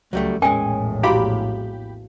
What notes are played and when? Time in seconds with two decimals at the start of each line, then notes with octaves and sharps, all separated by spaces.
0.13 C#2 F#3 G3 A3
0.42 A#1 E2 A2 G#3 C#4 A#4 G5 G#5
1.03 E4 F#4 G4 F5 B5